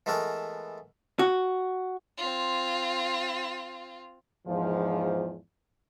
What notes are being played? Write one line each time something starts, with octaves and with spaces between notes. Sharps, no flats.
E3 G#3 A3 B3 A4 A#4
F#4
C4 F4
E2 G#2 F3